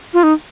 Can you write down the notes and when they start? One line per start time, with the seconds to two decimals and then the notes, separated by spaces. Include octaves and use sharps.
0.14 F4
0.23 D#4